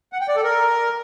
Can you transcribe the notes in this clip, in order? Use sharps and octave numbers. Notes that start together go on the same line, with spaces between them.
F#5
G5
D5
A4
A#4